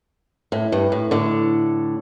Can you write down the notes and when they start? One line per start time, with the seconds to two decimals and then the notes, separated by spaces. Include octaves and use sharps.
0.52 A2
0.72 G2
0.92 A2
1.11 A2 D3